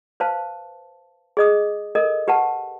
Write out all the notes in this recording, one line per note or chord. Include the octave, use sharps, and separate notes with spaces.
B4 C5 F5 A5
G#4 D#5 D#6
A4 A#4 D#5
G4 B4 F#5 A5